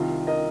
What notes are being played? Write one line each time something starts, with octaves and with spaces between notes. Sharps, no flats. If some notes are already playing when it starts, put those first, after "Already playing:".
Already playing: C2 C3 D#3 F4
A#4 D#5